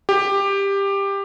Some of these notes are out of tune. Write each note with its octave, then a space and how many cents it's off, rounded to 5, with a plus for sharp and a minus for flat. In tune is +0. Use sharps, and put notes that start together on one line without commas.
G4 +15